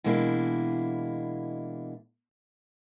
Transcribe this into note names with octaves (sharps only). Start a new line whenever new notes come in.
B2 E3 G#3 A#3 D4 E4